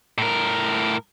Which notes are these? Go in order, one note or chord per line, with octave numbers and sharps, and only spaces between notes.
A2 A#4